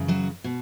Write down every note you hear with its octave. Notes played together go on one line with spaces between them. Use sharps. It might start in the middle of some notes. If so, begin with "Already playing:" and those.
Already playing: F#2 C#3 E3
F#3 F#4
B2